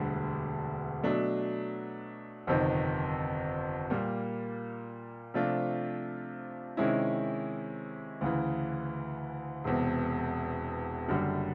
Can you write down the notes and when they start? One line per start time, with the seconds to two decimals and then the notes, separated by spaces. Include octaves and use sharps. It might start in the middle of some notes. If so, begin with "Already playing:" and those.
Already playing: E1 D2 D3 G3
1.03 B2 F#3 A3 D4
2.47 G1 F2 C3 D#3
3.90 A#2 G3 A#3
5.34 C3 F3 A3 D4 F4
6.77 C3 D#3 G#3 C#4 E4
8.21 D2 C#3 E3
9.64 E1 E2 C3
11.08 F#1 F#2 D3 G3